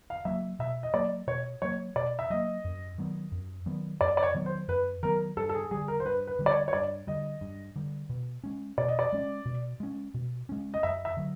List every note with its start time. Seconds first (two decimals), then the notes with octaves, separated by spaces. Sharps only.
0.10 F5
0.25 F#3 A#3 E5
0.59 B2 E5
0.83 D#5
0.94 F#3 A#3 D5
1.27 B2 C#5
1.62 F#3 A#3 C#5
1.96 B2 D5
2.19 E5
2.30 F#3 A#3 D#5
2.65 F#2
2.98 D#3 F#3 B3
3.32 F#2
3.66 D#3 F#3 B3
4.01 F#2 D5
4.17 D5
4.23 C#5
4.35 D#3 F#3 B3
4.46 C5
4.68 F#2 B4
5.03 D#3 F#3 B3 A#4
5.37 G2 A4
5.49 A4
5.54 G#4
5.71 D3 G3 G#4
5.88 A#4
6.00 C5
6.05 G2 B4
6.27 B4
6.39 D3 G3
6.46 D5
6.51 C#5
6.68 C#5
6.73 G2 D5
7.07 D3 G3 D#5
7.41 G2
7.76 D3 G3
8.09 B2
8.44 G#3 C#4
8.78 B2 D5
8.88 D#5
8.99 D5
9.13 G#3 C#4
9.46 B2
9.80 G#3 C#4
10.14 B2
10.49 G#3 C#4
10.74 D#5
10.83 F#2 E5
11.05 E5
11.17 D3 F#3